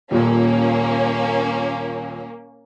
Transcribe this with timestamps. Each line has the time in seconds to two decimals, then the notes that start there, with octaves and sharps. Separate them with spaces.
0.11 D#1 A#2 A#3 C#4